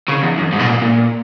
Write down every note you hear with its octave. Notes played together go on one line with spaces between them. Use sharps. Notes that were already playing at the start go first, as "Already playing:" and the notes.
C#3
E2
F#2
G#2
B2
A#2
A#2